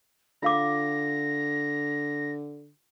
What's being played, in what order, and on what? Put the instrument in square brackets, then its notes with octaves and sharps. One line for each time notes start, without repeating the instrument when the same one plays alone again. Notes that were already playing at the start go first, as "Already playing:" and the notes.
[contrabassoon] D3 [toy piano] F4 F5 D6 [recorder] A#6